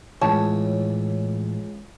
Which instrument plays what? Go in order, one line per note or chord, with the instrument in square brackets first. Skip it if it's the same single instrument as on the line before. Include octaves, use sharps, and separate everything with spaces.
[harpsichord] C#2 [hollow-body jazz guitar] A2 E3 C#5 [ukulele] A5